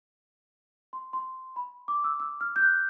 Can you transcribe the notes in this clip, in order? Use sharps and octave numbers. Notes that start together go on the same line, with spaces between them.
C6
C6
B5
D6
E6
E6
F6
G6
F#6